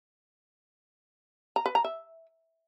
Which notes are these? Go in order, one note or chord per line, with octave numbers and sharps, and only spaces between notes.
A#5
B4
A#5
E5